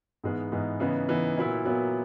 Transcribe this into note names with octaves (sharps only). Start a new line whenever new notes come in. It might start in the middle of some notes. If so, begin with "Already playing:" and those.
G#2 E3 G#3 B3 D#4
G#2 E3 G#3 B3 D#4
C#3 E3 B3 D#4
C#3 E3 B3 D#4
A#2 F#3 B3 E4
A#2 F#3 B3 E4